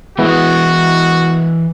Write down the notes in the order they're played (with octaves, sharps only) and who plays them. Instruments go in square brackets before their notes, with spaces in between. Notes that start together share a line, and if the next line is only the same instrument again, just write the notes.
[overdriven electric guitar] E3 D#5 [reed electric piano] G#3 B3 E4 [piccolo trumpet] F#4